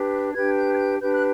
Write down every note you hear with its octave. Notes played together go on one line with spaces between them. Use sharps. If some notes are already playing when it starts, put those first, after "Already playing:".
Already playing: D4 G4 B4
D4 G4 B4 G#6
G6
G#6
G6
D4 G4 B4 G6
F#6